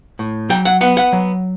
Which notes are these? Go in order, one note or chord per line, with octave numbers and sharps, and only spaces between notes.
A2
F#3 G5
F#5
B3 F#5
F#5
F#3